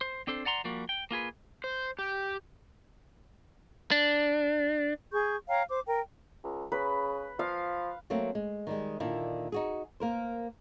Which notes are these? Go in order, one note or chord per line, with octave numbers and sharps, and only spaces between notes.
C5
C4 D4 A4 C5
D5 F#5 A#5 C6
F3 G3 A#3 F#4
G5
A#3 F4 G#4 B4
C5
G4
D4
G#4 C#6 G6
C#5 F5 G5 A#5
C5 D6
A#4 G5
C#2
C#3 B4
F3 F5
F#3 A3 A#3 C4
G#3
D#3 G3 G#3
A#2 D3 D#3 A#3 D4 E4
D#4 F#4 G#4
A#3 A#4 C5